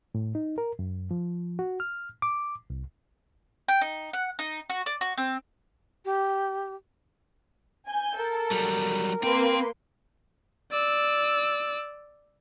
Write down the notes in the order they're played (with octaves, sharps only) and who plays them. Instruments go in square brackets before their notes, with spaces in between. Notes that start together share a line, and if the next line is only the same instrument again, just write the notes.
[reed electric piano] A2
D#4
A#4
F#2
F3
F#4
F6
D6
C2
[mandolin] G5
D#4
F#5
D#4
F#4
D5
F#4
C4
[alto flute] G4
[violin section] G#5 G6
[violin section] A4 [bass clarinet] A#4
[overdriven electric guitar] F#3 G3
[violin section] A#3 B4 C6 [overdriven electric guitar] C4 G5
[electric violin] D5 E6